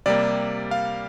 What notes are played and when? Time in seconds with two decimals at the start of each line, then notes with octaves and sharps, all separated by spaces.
0.06 C3 G3 A#3 D5
0.71 F5